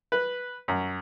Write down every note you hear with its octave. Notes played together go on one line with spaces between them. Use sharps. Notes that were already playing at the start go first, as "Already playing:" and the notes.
B4
F#2